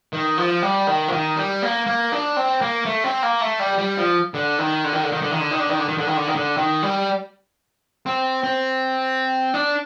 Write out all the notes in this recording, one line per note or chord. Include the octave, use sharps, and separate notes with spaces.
D#3
F3
G3
D#3
F3
D#3
G3
A#3
A#3
D4
C4
A#3
A3
C4
A#3
A3
G3
G3
F3
D3
D#3
D3
D#3
D3
D#3
D3
D#3
D3
D#3
D3
D#3
D3
D#3
D3
D#3
D3
D#3
D3
D#3
G3
C4
C4
D4